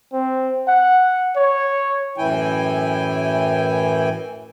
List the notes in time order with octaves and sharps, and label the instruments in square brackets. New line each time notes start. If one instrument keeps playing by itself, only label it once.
[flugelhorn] C4
F#5
C#5
[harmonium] F#2 A2 E3 E4 G5 G#5